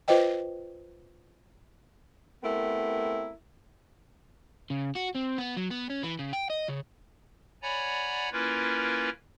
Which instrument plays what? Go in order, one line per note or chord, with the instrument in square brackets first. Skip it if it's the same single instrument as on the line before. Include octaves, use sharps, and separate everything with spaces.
[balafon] F4 B4 C5 D#5 G5
[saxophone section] A3 B3 C4 E4 G4 A#4
[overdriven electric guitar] C#3
F#4
C4
B3
F#3
B3
C#4
E3
C#3
G5
D#5
C#3
[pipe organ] C#5 D5 F#5 G#5 A#5 B5
A#3 C#4 E4 F4 A#4 B4